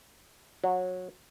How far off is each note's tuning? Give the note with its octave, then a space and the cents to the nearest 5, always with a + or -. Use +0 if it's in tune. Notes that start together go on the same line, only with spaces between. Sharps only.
F#3 -20